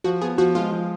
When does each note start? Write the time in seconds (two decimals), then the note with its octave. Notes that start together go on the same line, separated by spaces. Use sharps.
0.04 F3 F#4
0.21 B3 G#4
0.38 F3 F#4
0.55 G#3 F4
0.72 F3